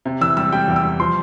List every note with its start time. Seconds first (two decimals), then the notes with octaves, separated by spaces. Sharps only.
0.05 C3
0.21 E3 E6
0.37 G3 E6
0.52 G3 G5
0.68 E2
0.76 E6
0.83 G3
1.00 F3 C6